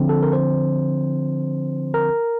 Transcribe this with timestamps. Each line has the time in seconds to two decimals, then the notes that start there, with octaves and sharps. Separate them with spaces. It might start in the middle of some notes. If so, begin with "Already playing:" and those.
Already playing: D3 F3 C4
0.09 A4
0.23 A#4
0.33 C5
1.94 A#4